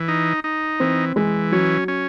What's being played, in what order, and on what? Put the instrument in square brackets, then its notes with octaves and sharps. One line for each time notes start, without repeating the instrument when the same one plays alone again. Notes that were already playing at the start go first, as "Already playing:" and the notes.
Already playing: [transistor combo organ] E3
D#4
D#4
[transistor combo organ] E3 [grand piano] C4
[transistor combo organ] E3 [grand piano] G#3
[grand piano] F#3 [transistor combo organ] C#4
[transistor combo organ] C#4